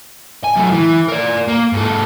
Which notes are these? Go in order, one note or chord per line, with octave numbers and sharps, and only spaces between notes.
G#5
F#2 A3
E3
A#4 D5
A#3
G#2 A4